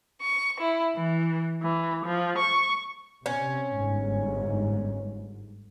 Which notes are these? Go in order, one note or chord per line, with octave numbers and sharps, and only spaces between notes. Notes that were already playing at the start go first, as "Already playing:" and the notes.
C#6
E4
E3
E3
F3
C#6
C3 C#4
G1 G#2